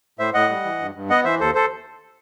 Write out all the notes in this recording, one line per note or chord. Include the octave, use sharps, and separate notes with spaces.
A2 C5 E5
A2 D#5 F#5
G3
E3
G2
G2
B3 D#5 F#5
E3 C5 E5
D#2 A4 C5
A4 C5